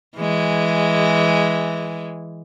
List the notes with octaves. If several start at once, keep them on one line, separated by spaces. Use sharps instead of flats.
E3 G#3